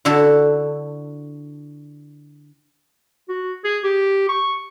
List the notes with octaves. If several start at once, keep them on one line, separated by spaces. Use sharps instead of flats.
D3 E4 F#4 A4
F#4
G#4
G4
C#6